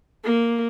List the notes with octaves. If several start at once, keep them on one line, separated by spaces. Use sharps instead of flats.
A#3